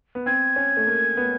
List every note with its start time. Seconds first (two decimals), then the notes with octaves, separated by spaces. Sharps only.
0.15 B3
0.26 C4 G#6
0.56 C#4
0.77 A3
0.87 A#3
1.17 B3